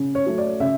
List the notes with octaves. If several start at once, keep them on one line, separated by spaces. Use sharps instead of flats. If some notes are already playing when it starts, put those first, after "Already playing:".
Already playing: C#3
C#5
F#3 A3
D5
C#3 E5